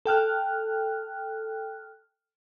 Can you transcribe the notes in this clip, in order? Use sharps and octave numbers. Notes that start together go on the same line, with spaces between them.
A4 G5 F6 F#6